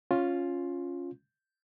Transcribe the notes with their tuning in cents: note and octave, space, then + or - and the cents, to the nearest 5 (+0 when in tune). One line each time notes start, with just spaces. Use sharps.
C#4 +0 F4 +5